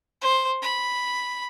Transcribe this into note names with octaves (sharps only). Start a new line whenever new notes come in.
C5
B5